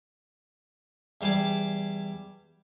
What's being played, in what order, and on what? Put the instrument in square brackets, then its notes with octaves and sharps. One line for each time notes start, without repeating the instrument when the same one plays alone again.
[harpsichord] E2 G3 C5 G#5 D6